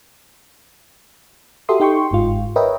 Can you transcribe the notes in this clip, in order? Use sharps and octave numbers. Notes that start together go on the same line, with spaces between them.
F#4 G4 A4 E5 C6 D#6
D#4 G4 G5 C6 C#6
G1 G#2 F4
A#4 B4 C#5 D#5 E5 G5